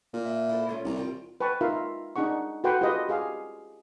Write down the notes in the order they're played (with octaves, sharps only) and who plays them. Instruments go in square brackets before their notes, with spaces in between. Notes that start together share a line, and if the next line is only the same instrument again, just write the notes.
[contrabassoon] A#2
[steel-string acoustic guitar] E5
E4 A4 C5
A3 C#4 F4
[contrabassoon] C2 [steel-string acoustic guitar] D5 A5 A#5
[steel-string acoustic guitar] D#3 F4 G5
[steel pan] B4 G5 A5 C#6
D#4 F4 A#4 E5 F5
D4 D#4 G#4 F#5 C#6
F#4 A4 B4 F#5 G5 C6
F4 G4 G#4 B4 D#5
G4 G#4 F5